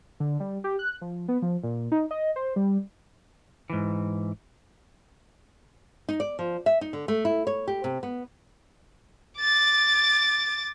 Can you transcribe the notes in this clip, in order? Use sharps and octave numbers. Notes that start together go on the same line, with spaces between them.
D3
G3
G4
F#6
F3
B3
F3
A#2
D#4
D#5
C5
G3
G#2 E3
D#4
D5
F3
E5
D#4
D3
A3
E4
C#5
G4
C3
B3
D6 A6